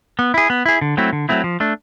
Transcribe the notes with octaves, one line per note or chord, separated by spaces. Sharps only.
B3
E4 G#4
B3
E4 G#4
D3
F#3 A3 C4 E4
D3
F#3 A3 C4 E4
F3
A3 D4